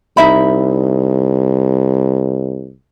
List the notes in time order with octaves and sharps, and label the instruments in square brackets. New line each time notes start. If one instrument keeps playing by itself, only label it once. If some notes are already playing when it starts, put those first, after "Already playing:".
[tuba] C2 [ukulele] D#4 E5 B5